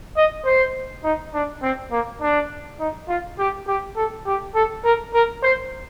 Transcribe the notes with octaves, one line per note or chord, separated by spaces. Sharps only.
D#5
C5
D#4
D4
C4
A#3
D4
D#4
F4
G4
G4
A4
G4
A4
A#4
A#4
C5